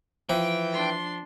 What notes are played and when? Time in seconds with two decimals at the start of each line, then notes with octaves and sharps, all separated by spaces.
0.29 E3 F3 G5
0.73 D4 C6